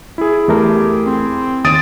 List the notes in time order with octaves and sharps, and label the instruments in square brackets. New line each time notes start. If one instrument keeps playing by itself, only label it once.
[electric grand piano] E4 G#4
[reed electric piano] E2 A3 A#4 [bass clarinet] G4
[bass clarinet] C4
[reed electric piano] D#2 [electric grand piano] D#6 A6 D7